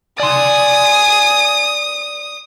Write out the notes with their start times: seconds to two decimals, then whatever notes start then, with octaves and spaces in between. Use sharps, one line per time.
0.20 D5 G#5 C6 D#6